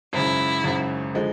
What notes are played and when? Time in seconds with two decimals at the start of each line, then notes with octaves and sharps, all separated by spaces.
0.13 G#1 F#2 C#3 E4
0.64 G#1 F#2 C#3
1.14 D3 F3 G#3